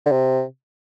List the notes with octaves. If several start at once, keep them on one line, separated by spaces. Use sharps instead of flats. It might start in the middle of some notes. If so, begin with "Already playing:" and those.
D3
C3